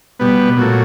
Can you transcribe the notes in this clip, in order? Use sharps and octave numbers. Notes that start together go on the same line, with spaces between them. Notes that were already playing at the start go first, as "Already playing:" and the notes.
B2 G3 B3
A#2 F#3 A3